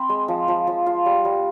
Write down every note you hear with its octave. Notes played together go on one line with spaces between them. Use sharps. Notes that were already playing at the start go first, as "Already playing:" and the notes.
Already playing: C4 B5
G#3
F3
F3
F3
F4
G3
G3